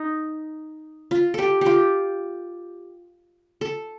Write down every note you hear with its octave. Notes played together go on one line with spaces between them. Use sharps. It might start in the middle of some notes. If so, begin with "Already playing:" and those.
Already playing: D#4
F4
G4 A4
F4 G4
A4